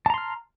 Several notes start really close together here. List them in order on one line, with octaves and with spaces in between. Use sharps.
A5 A#5 C6 F6